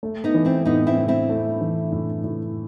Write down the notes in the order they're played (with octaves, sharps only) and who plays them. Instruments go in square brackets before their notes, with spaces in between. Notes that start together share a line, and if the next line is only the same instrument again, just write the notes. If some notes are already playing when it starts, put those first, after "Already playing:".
[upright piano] A3
[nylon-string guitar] B3 D#4
[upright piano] E3
[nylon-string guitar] C4 E4
[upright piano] A2 [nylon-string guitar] B3 D#4
[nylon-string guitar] C4 E4
[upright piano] A2
[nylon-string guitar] C4 E4
[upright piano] A3
E3
A2
A2